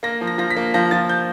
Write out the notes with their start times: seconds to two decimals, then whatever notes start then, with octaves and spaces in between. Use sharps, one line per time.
0.03 A#3 A#6
0.21 F3
0.27 A#6
0.38 F3 A#6
0.50 B6
0.57 A#3
0.74 F3 A#6
0.91 F3 A6
1.09 G6